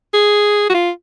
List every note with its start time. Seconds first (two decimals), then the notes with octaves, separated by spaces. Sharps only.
0.14 G#4
0.70 F#4
0.74 F4